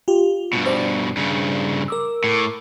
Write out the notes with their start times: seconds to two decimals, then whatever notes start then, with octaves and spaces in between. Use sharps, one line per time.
0.08 F4 G4
0.53 G2 B2
0.66 C5 D5
1.17 G2 C#3
1.88 A#4 D6 E6
2.24 A2